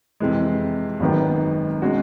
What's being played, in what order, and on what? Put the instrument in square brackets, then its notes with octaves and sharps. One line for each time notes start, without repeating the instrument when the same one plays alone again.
[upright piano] F2 C3 E3 G#3
G#1 F#2 D#3 F#3 B3
B2 G#3 C#4 F#4